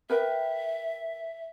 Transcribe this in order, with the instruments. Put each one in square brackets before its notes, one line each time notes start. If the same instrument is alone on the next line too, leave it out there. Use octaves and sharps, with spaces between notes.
[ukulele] A#4 B4 G5 [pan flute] E5